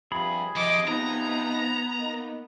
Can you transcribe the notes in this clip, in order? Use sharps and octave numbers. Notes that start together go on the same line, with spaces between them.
G2 C3 F3 G#4 B5
C3 F3 D#5 D6
C3 F3 B3 D#4 A#5
A#3 D#4